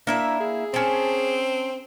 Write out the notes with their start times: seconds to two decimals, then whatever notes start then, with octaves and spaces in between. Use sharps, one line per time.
0.07 A#3 D4 E4 E5
0.40 G#4
0.74 C4 C#4 A5